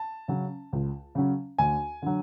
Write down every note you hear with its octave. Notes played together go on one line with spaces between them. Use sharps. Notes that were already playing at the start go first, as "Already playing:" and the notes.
Already playing: A5
C#3 F#3 C#4
C#2
C#3 F#3 C#4
D2 G#5
D3 F#3